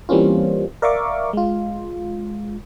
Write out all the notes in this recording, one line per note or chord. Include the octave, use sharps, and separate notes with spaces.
E3 G3 A#3 C4 C#4 F4
A#4 D5 E5 F5 C#6 D6
G#3 F4